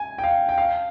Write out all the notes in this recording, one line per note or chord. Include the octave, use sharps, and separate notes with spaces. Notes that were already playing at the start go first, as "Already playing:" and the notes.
Already playing: G#5
G5
F5
G5
F5